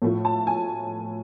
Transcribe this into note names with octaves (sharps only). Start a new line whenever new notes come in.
A2 F3 A3
A5
G#5